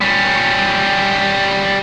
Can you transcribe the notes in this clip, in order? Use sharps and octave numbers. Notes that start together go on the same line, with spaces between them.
G3 C#4